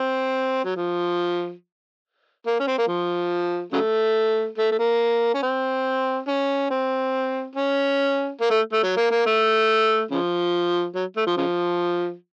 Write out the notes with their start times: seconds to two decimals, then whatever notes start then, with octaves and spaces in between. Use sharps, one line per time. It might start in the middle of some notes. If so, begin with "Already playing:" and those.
Already playing: C4
0.65 F#3
0.76 F3
2.46 A#3
2.60 C#4
2.67 C4
2.78 A#3
2.88 F3
3.73 C#3 F#3 A3
4.58 A3
4.72 A3
4.79 A#3
5.35 C#4
5.43 C4
6.28 C#4
6.71 C4
7.55 C#4
8.41 A#3
8.51 A3
8.72 A3
8.83 F#3
8.96 A#3
9.11 A#3
9.26 A3
10.11 C#3 F3
10.95 F#3
11.17 A3
11.27 F3
11.37 C#3 F3